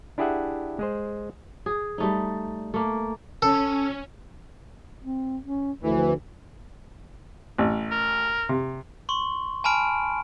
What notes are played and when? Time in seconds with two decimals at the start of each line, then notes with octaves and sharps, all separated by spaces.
0.18 D4 E4 G4 G#4 E5 F#5
0.79 G#3 G#4 C5
1.66 G#4
1.98 G3 A3 D#4
2.74 A3 A#3
3.42 C#4 A4
5.02 C4
5.44 C#4
5.83 D2 E3 F3
7.58 A1
7.91 A#4
8.49 C3
9.09 C6 C#6
9.64 G#5 A5 B5 F6 D7